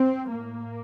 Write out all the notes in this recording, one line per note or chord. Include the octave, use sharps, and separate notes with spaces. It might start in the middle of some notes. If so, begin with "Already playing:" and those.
Already playing: C4
A2 A#3